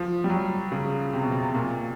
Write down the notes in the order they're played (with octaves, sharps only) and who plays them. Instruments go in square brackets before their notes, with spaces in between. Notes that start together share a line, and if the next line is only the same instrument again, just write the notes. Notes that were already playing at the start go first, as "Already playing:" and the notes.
Already playing: [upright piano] F3
G3
F#3
C#3
C3
B2
C3
A#2